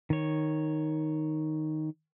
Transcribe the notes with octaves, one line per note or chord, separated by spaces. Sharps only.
D#3 C#5